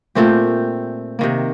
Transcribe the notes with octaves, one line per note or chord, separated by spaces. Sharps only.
A#2 A3 C4 G4
C3 D#3 A#3